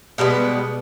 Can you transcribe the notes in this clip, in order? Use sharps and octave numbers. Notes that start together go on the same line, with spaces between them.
B2 G3 G#3 B3